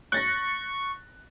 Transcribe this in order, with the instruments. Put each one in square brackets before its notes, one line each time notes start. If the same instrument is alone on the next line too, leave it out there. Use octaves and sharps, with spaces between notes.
[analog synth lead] C#6 [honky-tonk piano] F#6 A6 A#6